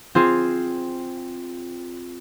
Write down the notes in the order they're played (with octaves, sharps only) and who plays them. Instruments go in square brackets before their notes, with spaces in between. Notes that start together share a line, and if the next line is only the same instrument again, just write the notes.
[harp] C4 F4 G#4